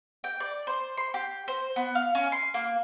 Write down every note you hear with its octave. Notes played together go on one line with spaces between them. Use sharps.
G5
D5
C5
C6
G4
C5
B3
F5
C#4
C6
A#3